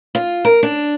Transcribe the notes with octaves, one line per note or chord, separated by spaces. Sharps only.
F4
A#4
D4